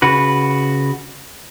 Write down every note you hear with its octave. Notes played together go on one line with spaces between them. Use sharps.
C#3 F#4 B4